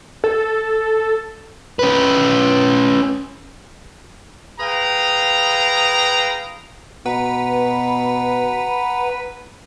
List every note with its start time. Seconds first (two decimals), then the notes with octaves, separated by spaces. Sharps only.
0.24 A4
1.79 C#4 B4
4.60 G#4 B4 F5 G5 A#5
7.06 B2 B4 F#5 A#5